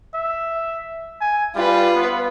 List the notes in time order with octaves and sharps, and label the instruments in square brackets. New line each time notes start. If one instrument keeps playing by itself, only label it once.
[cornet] E5
G#5
[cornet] G3 [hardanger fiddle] F4 B4
[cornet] B3